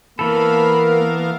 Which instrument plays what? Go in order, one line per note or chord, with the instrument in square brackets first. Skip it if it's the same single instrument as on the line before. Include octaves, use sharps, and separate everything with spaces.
[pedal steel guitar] E3 A4 [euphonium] A#3 [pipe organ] B3 A#4 F5 [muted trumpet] B5